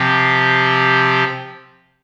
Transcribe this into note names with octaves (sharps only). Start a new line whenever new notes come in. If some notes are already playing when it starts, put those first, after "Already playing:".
Already playing: C3 F3 C4 G4